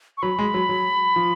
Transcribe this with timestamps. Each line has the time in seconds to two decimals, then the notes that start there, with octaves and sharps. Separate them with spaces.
0.18 C#6
0.22 F#3 B5
0.39 G#3
0.54 F#3
0.69 F#3
1.16 F3